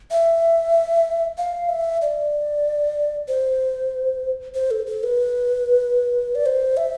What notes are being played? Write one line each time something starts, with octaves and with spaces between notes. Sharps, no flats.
E5
F5
E5
D5
C5
C5
A4
A4
B4
D5
C5
E5